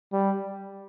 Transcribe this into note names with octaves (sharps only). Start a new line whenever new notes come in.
G3